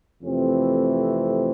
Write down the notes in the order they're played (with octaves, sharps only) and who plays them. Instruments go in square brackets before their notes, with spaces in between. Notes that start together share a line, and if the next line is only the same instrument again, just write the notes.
[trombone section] F2 C3 E3 A3 C4